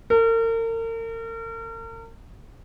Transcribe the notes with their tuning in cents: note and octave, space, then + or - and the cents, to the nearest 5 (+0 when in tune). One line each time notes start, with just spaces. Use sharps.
A#4 -40